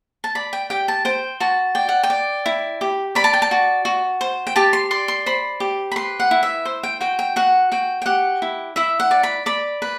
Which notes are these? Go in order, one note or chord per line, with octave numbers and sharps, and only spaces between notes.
A5
D5 B5
G5
G4 G5
A5
C5 G5
F#4 A5
D5 G5
F#5
G5
D5
E4
G4
D5 B5
A5
G5
A5
F#4
F#4
C5
G5
G4 A5
C6
D5 C6
C6
C5 B5
G4
B5
B4 C6
F#5
E4
E5
C5
G5
F#4 G5
G5
F#4 F#5
F#4 G5
G5
G4 F#5
E4
E4 E5
F#5
D5
B5
D5 B5
B4